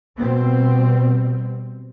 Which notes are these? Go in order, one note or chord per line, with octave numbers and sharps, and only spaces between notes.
B2 G3 C4